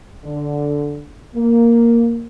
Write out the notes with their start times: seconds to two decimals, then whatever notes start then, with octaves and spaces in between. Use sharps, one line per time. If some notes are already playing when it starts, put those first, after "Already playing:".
0.25 D3
1.35 A#3